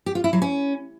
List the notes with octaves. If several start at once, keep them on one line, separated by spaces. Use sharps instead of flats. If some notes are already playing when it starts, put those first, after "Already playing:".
G4
F4
E4
F#3
C#4